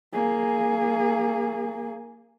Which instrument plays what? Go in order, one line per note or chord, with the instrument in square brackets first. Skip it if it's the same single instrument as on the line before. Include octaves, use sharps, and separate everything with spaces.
[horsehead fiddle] A#3 G#4